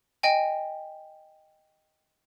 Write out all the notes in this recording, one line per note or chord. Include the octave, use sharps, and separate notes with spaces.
D#5 G5 G#5